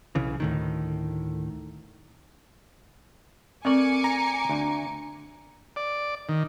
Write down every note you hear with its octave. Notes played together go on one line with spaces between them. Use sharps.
B1 C#3 E3
D2 A2 D#3
A3 C4 A#4 D5 G#5 C#6 D6 C#7
A#5
D2
D5
D#3